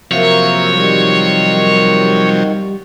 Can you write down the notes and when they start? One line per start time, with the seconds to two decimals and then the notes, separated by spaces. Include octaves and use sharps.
0.11 C3 F3 F#3 A#3 C#5 E5
0.73 D#3 G3